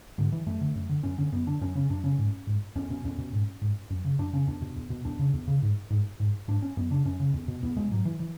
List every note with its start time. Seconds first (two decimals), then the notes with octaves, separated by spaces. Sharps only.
0.18 G#2 D3
0.32 E3
0.46 F#2 A3
0.61 D3
0.75 F#2
0.89 D3
1.03 F#2 C#4
1.18 D3 C#4
1.32 F#2 B3
1.47 D3 D4
1.61 F#2 C#4
1.75 C#3 C#4
1.90 F#2 D4
2.04 C#3 C#4
2.18 G#2
2.47 G#2
2.75 E2 C#4
2.90 B2 C#4
3.04 E2 C#4
3.18 B2
3.33 G#2
3.62 G#2
3.90 F#2
4.05 C#3
4.19 F#2 D4
4.33 C#3 C#4
4.47 E2 D4
4.62 B2
4.76 E2
4.90 B2
5.05 E2 D4
5.19 C#3
5.33 E2
5.48 C#3
5.62 G#2
5.90 G#2
6.20 G#2
6.48 G#2 D4
6.62 C#4
6.77 F#2 B3
6.90 C#3 D4
7.05 F#2 C#4
7.20 C#3
7.34 E2
7.48 B2
7.63 E2 B3
7.77 B2 G#3
7.91 G#2 F#3
8.05 E3
8.20 E3